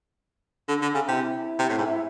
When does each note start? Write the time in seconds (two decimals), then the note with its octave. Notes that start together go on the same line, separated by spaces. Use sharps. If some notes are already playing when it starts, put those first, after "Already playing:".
0.68 D3
0.82 D3
0.95 C#3
1.08 C3 E4
1.59 C3
1.69 A2
1.78 G#2